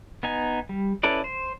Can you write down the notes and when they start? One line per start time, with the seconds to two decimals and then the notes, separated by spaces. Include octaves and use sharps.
0.23 B3 D#4 G#5
0.69 G3
1.03 C#4 E4 A4 B4 D5
1.24 C5